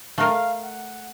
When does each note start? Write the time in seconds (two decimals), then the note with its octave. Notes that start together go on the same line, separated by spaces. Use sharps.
0.18 A3 A#4 F5
0.63 F#5